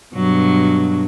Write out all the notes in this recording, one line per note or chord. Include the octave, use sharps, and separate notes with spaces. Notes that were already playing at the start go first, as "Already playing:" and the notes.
G2 B2 F#3